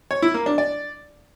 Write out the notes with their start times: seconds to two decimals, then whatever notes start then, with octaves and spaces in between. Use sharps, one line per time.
0.11 C#5
0.22 E4
0.34 A#3
0.46 D4
0.58 D5